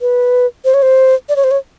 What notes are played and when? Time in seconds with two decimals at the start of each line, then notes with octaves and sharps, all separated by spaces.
0.01 B4
0.65 C5
0.74 C#5
0.82 C5
1.29 D5
1.36 C#5
1.44 C5
1.51 C#5